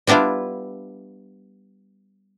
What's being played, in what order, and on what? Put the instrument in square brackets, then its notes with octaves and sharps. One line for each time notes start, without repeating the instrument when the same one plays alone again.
[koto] G3 B3 D4 E4 F4